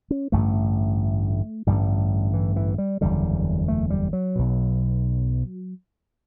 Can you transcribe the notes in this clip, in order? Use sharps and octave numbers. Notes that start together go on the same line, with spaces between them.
C#4
A1 G2 D3 A3
A1 G2 D3 G3
E3
E3
G3
F#1 E2 D3 G3
A3
G3
F#3
B1 B2